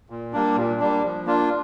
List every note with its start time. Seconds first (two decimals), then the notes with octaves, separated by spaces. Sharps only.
0.10 A#2
0.33 G3 A#3 D4
0.56 A#2
0.80 G3 A#3 D4
1.03 F3
1.26 A#3 D4 F4